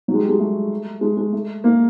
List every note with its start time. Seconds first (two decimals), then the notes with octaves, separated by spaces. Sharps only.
0.08 F#3
0.14 G#3
0.18 G3
0.29 G#3
0.39 A3
1.01 G#3
1.17 G#3
1.32 A3
1.64 A#3